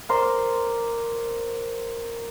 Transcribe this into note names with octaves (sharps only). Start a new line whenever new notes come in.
A#4 C5 D5 C6